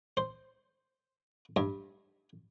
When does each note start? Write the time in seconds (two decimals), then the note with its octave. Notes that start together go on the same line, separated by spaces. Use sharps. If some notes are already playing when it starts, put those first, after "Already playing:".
0.17 C5
1.56 G2